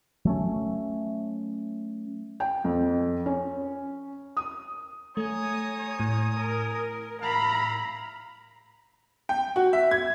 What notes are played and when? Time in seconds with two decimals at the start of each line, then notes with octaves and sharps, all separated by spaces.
0.25 F#3 A3 C#4
2.40 G5
2.64 F2
3.26 C#4
4.37 D#6
5.17 A3 C#5 G#5 A#5 D#6
6.00 A2
6.36 A#4
6.73 A#4
7.22 E4 F5 A#5 B5
9.29 G5
9.56 F#4
9.73 E5
9.91 G#6